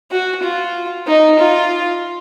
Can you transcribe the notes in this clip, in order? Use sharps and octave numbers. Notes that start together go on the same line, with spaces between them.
F#4
F4
D#4
F4